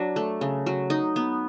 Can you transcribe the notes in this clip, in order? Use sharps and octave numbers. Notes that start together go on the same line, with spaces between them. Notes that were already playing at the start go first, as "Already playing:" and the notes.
Already playing: F#3 D4
A3
C#3
F#3
D#4
B3